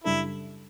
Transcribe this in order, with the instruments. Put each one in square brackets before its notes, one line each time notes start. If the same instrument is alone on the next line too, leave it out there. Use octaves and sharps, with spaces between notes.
[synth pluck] F#2 C#3 G3 D4 A4 [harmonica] E4